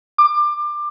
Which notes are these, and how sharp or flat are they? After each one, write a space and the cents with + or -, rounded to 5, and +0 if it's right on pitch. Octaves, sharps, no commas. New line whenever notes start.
D6 +25